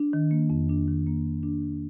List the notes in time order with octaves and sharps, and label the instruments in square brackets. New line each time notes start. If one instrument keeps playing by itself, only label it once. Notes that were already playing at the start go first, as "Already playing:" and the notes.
Already playing: [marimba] D4
D#3
A#3
F2
D4
D#3
A#3
F2
D4
D#3